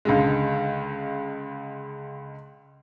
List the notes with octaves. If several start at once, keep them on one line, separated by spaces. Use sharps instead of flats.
C#2 D3 G#3